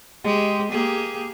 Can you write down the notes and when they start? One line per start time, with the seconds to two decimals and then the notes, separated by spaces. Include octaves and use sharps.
0.24 G#3 G4
0.70 A#3 G4 G#4